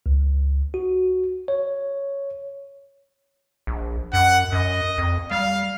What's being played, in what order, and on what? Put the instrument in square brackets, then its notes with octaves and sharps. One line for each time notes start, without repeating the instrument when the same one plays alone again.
[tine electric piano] C#2
F#4
C#5
[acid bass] A#1
[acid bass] F#2 [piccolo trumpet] F#5
[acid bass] F#2 [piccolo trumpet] D#5
[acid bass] F2
[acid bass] G3 [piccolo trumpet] F5